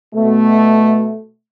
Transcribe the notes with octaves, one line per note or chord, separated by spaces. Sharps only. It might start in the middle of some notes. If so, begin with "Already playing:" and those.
B2 A3